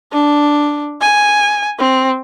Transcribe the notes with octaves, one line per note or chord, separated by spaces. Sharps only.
D4
G#5
C4